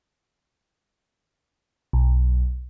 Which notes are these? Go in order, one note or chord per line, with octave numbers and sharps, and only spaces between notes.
B1